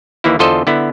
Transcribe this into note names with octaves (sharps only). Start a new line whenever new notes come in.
D#2 E3 A#3 E4
E2 D3 F4 A4 C5 D#5
D3 B3 E4